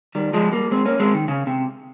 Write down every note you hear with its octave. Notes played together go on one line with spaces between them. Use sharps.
D#3 G3
F3 G#3
G3 A#3
G#3 C4
A#3 C#4
G#3 C4
D#3
C#3
C3